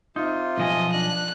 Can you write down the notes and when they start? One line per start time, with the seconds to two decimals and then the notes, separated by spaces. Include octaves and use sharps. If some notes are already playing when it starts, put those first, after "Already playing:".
0.16 C3 D#4 F4
0.57 B1 F3 D#5 G#5
0.92 D4 F#6